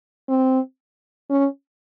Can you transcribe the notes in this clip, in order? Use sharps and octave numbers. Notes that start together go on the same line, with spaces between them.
C4
C#4